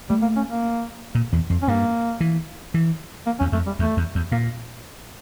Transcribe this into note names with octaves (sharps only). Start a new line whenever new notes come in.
G3 A3
A#3
C#4
A#3
A#2
E2
F2
C#4
G2 A#3
E3
E3
A#3
E2 C#4
F2 A3
G3
E2 A3
E2
E2
A#2 A#3